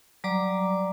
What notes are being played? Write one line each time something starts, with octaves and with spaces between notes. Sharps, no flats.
F#3 G3 D5 A#5 D6